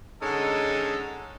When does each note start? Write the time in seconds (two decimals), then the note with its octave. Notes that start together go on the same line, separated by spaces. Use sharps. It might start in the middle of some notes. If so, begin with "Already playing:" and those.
0.23 D3 G#3 C#4 D#4 A4